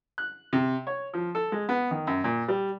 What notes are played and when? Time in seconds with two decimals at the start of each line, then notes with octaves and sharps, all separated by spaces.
0.18 F#6
0.53 C3
0.87 C#5
1.14 F3
1.35 A4
1.52 G#3
1.69 B3
1.91 D#3
2.07 F#2
2.24 A#2
2.48 G3